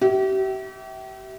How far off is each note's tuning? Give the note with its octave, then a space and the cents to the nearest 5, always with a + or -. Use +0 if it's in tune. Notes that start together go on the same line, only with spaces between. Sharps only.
G4 -40 E5 -10